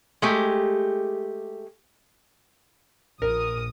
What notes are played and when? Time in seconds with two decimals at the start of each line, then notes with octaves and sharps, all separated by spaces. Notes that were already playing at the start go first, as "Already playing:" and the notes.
0.22 G#3 A3 G4
3.22 A#1 A#4 D#6